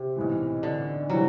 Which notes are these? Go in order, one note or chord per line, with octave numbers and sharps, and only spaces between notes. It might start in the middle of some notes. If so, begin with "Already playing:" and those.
Already playing: C3
B1 A2 E3
D3
C3 E3 F#3 G3